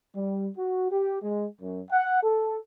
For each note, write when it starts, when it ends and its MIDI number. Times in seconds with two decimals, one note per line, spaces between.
0.15 0.49 55
0.57 0.87 66
0.91 1.19 67
1.22 1.46 56
1.61 1.81 42
1.90 2.21 78
2.22 2.58 69